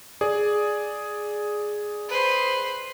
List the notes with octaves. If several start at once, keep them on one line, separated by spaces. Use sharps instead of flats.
G#4 D5
B4 C5